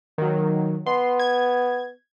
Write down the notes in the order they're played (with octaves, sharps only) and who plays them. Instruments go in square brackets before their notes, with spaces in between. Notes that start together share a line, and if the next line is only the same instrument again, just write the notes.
[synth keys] D#3 F#3 [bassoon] A#3
[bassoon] B3 [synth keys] C6
[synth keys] G#6